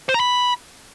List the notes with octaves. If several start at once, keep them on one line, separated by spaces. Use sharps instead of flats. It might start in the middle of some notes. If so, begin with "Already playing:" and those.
C5
A#5
B5